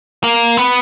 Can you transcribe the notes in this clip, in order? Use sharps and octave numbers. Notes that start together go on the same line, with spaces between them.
A#3
B3